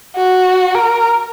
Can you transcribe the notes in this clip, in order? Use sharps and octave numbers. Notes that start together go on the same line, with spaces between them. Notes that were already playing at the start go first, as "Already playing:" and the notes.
F#4
A#4